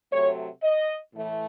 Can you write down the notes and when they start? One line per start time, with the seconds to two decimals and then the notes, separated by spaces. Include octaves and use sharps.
0.12 C3 F#3 A3 C#5
0.63 D#5
1.14 A2 E3 A3